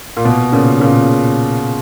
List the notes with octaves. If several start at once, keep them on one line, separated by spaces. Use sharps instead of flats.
A#2
B2
A#2 C#3
A#2 C#3